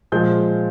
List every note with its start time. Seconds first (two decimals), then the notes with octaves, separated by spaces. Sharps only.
0.12 A#2 F3 G#3 G6